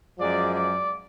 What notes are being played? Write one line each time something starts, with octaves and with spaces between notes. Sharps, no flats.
F#2 F3 G#3 D5
D5